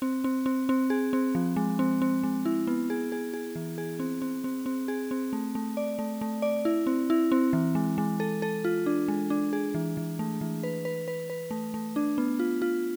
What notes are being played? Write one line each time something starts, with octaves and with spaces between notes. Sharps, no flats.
C4
C4
C4
C4
G#4
C4
F3
G#3
C4
C4
G#3
E4
B3
G#4
G#4
G#4
E3
G#4
C4
C4
C4
C4
G#4
C4
A3
A3
D5
A3
A3
D5
E4
C4
E4
C4
E3
G#3
G#3
A4
A4
F4
D4
G#3
D4
G#4
E3
E3
A3
E3
B4
B4
B4
B4
A3
A3
D4
B3
F4
F4